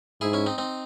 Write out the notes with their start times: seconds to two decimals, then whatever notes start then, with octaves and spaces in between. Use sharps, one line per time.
0.21 G#2 E4 G#4
0.33 C#4 E4
0.47 C4 D#4
0.58 C4 D#4